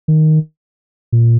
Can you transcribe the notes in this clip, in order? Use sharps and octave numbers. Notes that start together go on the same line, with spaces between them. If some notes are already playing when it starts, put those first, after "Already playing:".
D#3
A#2